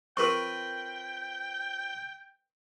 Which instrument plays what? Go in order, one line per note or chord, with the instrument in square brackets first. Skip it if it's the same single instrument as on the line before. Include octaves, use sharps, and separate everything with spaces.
[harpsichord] C4 F4 B4 [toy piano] A#4 C#6 [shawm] G5